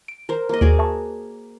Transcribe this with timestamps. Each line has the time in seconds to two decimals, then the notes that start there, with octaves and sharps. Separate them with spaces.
0.08 D7
0.29 A#4 C5
0.49 A#3 D#5
0.61 D#2 F#4 G#4 D5
0.79 E5 A5 C#6